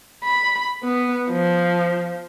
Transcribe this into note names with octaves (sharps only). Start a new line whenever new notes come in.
B5
B3
F3